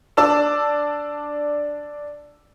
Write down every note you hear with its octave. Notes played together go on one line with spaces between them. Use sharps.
D4 D5 A5 E6 E7